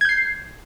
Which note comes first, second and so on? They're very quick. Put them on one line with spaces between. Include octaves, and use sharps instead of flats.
G#6 G6 C7